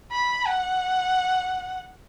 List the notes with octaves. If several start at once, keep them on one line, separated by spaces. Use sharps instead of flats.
B5
F#5